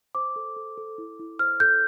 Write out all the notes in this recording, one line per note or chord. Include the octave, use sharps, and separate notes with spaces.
C5 D6
A4
A4
A4
E4
E4
C5 F6
A4 G6